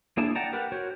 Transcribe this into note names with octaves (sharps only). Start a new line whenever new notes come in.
A#3 D4 E4 G#4 A5
D5 F#5 G5 A5 A#5
G4 A#4 B4 F#5
F#4 A#4 C5 C#5